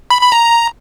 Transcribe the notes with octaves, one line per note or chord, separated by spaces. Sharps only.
B5
B5
A#5
A#5